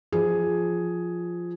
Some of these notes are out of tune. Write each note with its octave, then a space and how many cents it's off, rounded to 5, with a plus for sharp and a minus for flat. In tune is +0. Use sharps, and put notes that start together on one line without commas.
F3 +0 G#4 +0